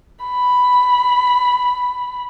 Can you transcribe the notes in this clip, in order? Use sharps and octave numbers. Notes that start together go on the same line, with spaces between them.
B5